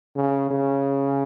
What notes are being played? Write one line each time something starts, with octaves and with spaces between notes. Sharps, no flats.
C#3
C#3